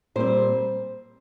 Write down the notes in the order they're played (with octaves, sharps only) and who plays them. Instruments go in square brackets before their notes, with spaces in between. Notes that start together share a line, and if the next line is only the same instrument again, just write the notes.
[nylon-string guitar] A#2 G3 C4 C5